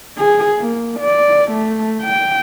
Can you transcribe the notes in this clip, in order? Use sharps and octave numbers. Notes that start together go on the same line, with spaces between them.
G#4
A#3
D5
A3
G5